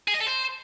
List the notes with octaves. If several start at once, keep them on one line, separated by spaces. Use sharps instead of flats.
G#4
D#5
A4
C5